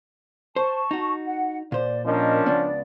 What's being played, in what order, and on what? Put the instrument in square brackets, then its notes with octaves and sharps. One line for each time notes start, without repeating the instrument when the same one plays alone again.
[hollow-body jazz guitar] C5 [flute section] A5 C#6
[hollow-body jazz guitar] D#4 F#4
[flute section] F#5
[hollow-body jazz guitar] A#2 C5 [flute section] D5
[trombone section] F3 C#4 D4 [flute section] A#4 D#5
[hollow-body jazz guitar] C#2 B3 [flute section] D5